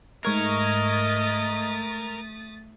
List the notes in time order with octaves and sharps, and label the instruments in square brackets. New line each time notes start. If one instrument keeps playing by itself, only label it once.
[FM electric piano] G#2 C#6 G#6 [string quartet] A3 D#6 A6 [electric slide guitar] A#4 [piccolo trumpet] D#5